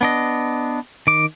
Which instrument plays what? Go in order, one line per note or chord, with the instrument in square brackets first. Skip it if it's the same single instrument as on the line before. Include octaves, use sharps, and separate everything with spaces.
[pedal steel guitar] B3 D4 D#5
D#3 D6